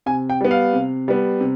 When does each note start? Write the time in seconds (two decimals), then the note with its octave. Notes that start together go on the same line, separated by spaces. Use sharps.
0.06 C3 G#5
0.30 G5
0.41 G3 B3
0.51 F5
0.73 C3
1.08 G3 B3
1.41 C3